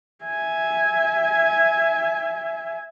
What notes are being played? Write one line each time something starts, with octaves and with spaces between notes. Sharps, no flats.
E5 G#5